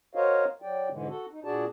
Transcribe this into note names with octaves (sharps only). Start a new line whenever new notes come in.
F#4 A#4 C5 C#5 D#5 F5
F#3 D5 G5
G#2 B2 D3 E3 G#3
F#4 A4
D#4
A#2 D4 F#4 G#4 D5 A5